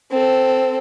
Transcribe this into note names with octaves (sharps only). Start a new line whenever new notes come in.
C4 A4